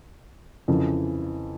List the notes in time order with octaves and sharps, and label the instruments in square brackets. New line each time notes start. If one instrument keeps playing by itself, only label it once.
[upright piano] F2 C#3 E3